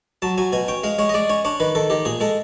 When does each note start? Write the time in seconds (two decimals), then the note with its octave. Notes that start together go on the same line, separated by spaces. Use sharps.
0.22 F#3 A5
0.38 F#3 G#5
0.53 B2 G#5
0.68 C#4 G5
0.84 G#3 F5
0.99 G#3 C#5
1.09 D#5
1.14 G#3 D5
1.30 C#4 C#5
1.45 D4 C#5
1.60 D#3 B4
1.75 D#3 A4
1.90 D#3 G4
2.05 A#2 G#4
2.20 G#3 A4